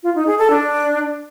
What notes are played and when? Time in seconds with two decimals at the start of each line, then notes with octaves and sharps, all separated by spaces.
0.03 F4
0.15 D#4
0.27 G#4
0.38 A4
0.50 D4